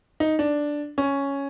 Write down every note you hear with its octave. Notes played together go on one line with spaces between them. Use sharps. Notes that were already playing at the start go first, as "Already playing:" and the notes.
D#4
D4
C#4